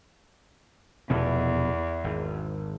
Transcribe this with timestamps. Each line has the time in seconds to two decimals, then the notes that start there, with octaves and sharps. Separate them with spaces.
1.10 F1 E2 B2 B3
2.04 G#1